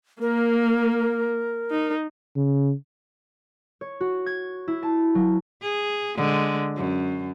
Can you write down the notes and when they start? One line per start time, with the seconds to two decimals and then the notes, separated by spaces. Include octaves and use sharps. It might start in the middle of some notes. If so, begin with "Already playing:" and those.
0.21 A#3 A#4
1.70 D#4
2.36 C#3
3.81 C#5
4.01 F#4
4.26 G#6
4.68 E4
4.83 A5
5.15 F#3
5.62 G#4
6.16 D3 G#3
6.76 F#2